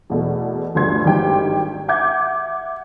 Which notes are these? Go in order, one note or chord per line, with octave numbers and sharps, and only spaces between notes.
E2 B2 A3
G1 D2 G2 F#4 C6 G#6
G#1 G2 D#3 F#4 G4 G5
E5 F#5 D6 G6 G#6